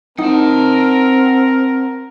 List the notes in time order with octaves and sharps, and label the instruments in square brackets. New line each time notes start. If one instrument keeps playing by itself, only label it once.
[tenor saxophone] C4 [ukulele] D#4 [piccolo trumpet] A#4 [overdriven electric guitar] F#5 A5